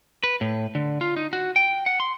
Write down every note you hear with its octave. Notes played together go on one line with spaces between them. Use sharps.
B4
A2
D3
F4
D#4
F#4
G5
F#5
C6